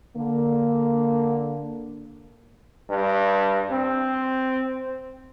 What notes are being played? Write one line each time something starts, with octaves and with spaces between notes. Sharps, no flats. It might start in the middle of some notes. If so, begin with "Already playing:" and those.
D3 A#3
G2
C4